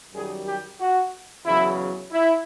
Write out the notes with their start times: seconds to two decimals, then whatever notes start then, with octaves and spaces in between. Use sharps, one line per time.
0.14 F#2 D#3 G3 G#4
0.46 G4
0.80 F#4
1.45 E2 C#3 F#3 E4
2.11 E4